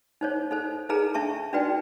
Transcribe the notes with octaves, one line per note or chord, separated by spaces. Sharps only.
D#4 C5 C#5
D#4 A4 C5
D#4 G#4 A4 B4 A#5
D4 E5 A5 C#6
D4 D#4 F#4 B4 D5 G5